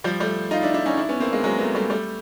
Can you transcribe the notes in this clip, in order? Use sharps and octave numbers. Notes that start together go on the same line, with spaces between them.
F3 G3
G3 A3
D#4 F4
D4 E4
D4 E4
C#4 D#4
D4 E4
B3 C#4
A#3 C4
G#3 A#3
F#3 G#3
A3 B3
G3 A3
G3 A3